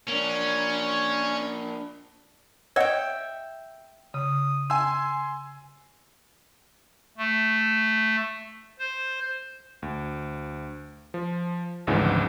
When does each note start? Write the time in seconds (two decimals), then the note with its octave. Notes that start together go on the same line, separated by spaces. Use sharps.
0.08 A#3 C#4 D4
2.76 C#5 D#5 E5 F#5 G5
4.14 C#3 D#6
4.70 G#5 C6 E6
7.18 A3
8.79 C5
9.82 D2
11.14 F3
11.87 G#1 D2 G#2 C#3 E3 F3